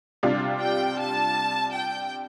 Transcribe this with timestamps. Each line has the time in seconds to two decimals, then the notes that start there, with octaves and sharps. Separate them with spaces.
0.23 C3 G3 D4 F4
0.60 G5
0.98 A5
1.72 G5